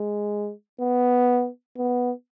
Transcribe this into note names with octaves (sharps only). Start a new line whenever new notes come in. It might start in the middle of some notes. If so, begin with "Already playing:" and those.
Already playing: G#3
B3
B3